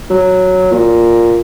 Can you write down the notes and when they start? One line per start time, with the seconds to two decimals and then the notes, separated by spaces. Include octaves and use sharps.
0.10 F#3
0.73 A#2